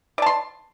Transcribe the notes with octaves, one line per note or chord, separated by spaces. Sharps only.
D5 A5 C6